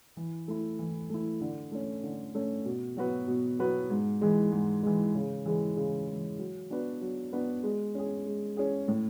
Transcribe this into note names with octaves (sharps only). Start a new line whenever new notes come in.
E3
A3 E4
E3
A3 E4
D3
A3 C#4
D3
A3 C#4
B2
F#3 B3 F#4 B4
B2
F#3 B3 F#4 B4
G#2
E3 G#3
G#2
E3 G#3
C#3
E3 G#3
C#3
E3 G#3
F#3
B3 D4 F#4 B4
F#3
B3 D4 F#4 B4
G#3
C#4 G#4
G#3
C#4 G#4
A2